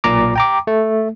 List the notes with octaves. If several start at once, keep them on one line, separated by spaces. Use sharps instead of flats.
B1 A#2 A#5 D6
G5 A#5 D6
A3